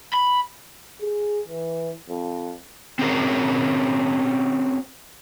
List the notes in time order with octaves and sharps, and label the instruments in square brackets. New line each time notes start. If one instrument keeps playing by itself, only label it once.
[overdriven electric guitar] B5
[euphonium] G#4
E3
F2
[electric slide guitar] C4 C#4 F#4 G#4 A#4 C5